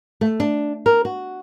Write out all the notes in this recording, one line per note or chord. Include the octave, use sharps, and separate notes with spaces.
A3
D4
A#4
F#4